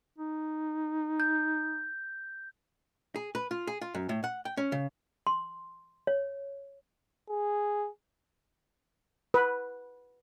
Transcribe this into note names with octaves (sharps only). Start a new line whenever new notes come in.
D#4
G6
G#4
B4
F4
G#4
F4
F#2
A2
F#5
G5
C#4
C#3
C6
C#5
G#4
B4